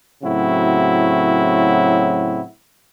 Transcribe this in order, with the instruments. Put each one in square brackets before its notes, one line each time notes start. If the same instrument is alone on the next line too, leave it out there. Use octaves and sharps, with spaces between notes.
[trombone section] A2 C#3 F#3 C4 E4 F#4